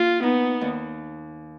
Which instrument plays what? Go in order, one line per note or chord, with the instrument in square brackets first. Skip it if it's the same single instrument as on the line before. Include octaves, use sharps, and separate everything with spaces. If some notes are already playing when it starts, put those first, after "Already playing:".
Already playing: [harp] A#3 [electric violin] F4
[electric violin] B3 [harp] D#4
[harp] D#2